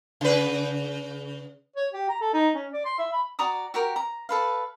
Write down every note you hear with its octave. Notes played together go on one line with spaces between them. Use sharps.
C#3 B4
C#5
G4
A#5
A4
D#4
C#4
D5
C6
E5
B5
F#4 D5 A#5 D#6
F#4 G4 A#4
A#5
A4 B4 F5